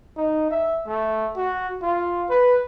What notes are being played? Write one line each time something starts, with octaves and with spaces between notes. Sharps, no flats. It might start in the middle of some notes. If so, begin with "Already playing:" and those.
D#4
E5
A3
F#4
F4
B4